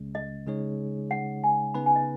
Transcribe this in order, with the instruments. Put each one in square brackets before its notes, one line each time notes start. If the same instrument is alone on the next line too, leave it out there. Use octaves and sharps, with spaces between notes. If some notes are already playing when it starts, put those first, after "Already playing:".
Already playing: [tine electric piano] C#2 C#3 G#3 C#4
[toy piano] D#5
[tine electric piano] C#3 G#3 D#4 G#4 C#5
[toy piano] F#5
G#5
[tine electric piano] C#3 B3 D#4 B4 [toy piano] B5
[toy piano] G#5
D#5